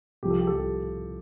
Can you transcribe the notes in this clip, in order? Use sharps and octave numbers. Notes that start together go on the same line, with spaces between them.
C2 C3 F3 G4
A4
G4
A4
C2 C3 F3 G4